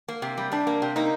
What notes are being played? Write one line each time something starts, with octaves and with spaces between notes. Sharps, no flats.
A#3
C3
G3
C3 D4
A#3
C3
A#3 D#4